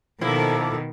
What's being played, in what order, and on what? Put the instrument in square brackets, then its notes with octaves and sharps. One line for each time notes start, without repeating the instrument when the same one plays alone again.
[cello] B2 D#3 [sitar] F3 A#3 E4 [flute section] A4 D6